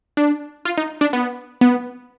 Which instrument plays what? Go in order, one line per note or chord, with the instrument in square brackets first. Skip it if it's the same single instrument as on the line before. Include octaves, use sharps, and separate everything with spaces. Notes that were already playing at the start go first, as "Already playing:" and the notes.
[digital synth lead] D4
F4
D#4
D4
B3
B3